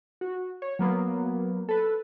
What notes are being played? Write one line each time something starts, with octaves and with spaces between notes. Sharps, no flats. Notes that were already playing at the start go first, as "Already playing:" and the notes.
F#4
C#5
F#3 A#3 B3
A4 B4